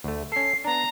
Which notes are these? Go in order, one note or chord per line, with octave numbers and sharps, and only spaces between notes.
D2 A3
C#4 A4 C7
B3 D4 A#5